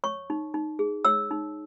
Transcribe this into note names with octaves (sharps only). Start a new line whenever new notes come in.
C#5 C#6
D#4
D#4
G#4
C#5 E6
D#4